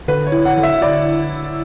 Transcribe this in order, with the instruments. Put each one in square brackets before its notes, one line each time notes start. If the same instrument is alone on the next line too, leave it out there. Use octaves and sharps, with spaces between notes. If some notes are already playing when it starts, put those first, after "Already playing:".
[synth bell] D3 [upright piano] B4
[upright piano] C#5
[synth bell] E4
[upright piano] F#5
[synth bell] D3
[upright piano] E5
[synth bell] E4 [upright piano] D5